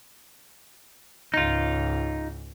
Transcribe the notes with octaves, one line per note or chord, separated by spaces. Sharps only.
C#2 G#2 D#4 F4